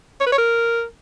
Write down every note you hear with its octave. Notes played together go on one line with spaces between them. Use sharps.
C#5
B4
C#5
A#4